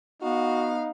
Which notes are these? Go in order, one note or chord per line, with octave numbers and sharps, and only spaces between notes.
B3 D#4 F#4 F5